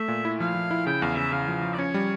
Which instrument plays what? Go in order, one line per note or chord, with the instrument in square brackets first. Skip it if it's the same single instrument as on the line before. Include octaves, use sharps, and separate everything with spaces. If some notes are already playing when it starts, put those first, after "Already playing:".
Already playing: [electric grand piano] A3 [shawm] E5
[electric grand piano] A#2
E4
[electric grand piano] F3 [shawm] F5
[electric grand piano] F3
E4
[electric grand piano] C#3 [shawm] G5
[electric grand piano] E2 [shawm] F5
[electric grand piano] C#3 [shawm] E5
[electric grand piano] C#3 [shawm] F5
[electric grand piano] F3
F3
[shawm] D5
[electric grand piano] C#4 [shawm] C#5
[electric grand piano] G3